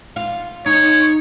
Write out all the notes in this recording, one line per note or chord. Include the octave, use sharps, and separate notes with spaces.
F4
D#4 C#5